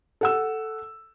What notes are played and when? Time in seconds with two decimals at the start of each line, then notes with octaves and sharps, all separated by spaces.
0.21 A4 F#5 E6